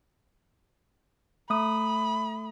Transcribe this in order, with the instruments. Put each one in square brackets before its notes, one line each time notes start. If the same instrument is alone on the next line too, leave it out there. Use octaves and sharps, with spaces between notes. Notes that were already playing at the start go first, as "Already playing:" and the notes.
[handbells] A3 D#6 [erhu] B5